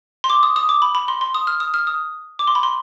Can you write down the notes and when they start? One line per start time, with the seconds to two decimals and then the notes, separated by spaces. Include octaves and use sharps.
0.24 C6
0.30 D6
0.43 D#6
0.56 D#6
0.69 D6
0.82 B5
0.95 B5
1.08 C6
1.21 C6
1.34 D#6
1.47 F6
1.60 D#6
1.74 F6
1.87 D#6
2.39 D6
2.47 C6
2.55 B5
2.63 C6